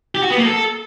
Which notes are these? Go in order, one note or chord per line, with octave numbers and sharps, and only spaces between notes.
G4
F#4
B3
A#3
A4